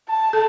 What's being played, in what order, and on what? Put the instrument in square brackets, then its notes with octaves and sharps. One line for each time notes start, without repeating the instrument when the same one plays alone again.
[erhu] A5
[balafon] A4